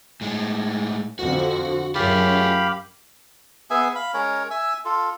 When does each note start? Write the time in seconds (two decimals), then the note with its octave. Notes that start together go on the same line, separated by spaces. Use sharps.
0.21 A2 G#3
1.19 F2 D3 F3 F#4
1.95 F#2 F4 G4 G#4 F5 B5
3.70 B3 G#4 E5 G#5
3.95 F5 B5
4.14 G#3 C#4 A#4 C#5
4.51 E5 G#5 E6
4.85 F4 A4